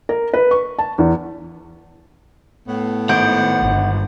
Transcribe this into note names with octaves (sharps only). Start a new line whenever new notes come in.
A#4
B4
C#6
A5
E2
A2 B3
G#1 F#5 G6 D7
G1